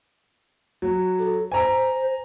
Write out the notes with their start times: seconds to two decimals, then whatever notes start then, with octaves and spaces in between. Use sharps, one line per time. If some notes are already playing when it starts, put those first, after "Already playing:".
0.82 F#3
1.19 A4
1.52 C5 G#5 A#5